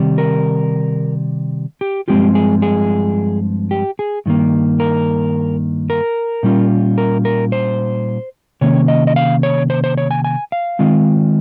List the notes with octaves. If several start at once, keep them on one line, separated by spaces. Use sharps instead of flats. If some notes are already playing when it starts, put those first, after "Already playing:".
Already playing: C3 D#3 G3
A#4
G4
G2 F3 G#3 C4 F4 G4
G#4
G#4
G4
G#4
G2 D#3 A#3
A#4
A#4
A#2 G3 C#4 F4
A#4
A#4
C5
C3 D#3 A#3 C#4 C#5
D#5
D#5
F5
C#5
C5
C5
C#5
G#5
G#5
F5
D#3 G#3 C4 F4